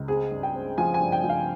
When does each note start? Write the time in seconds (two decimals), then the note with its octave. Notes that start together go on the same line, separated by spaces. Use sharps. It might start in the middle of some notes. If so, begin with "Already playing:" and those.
Already playing: C#2
0.08 C4 G#4
0.31 G2
0.43 G5
0.54 C4
0.78 F3 G#5
0.94 G#5
1.00 G2
1.12 G5
1.24 F3
1.29 F5